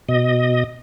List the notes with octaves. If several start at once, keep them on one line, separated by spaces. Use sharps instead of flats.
B2 D#5